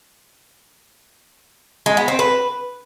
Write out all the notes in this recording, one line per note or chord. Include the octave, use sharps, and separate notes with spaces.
G#3
B3
C4
B4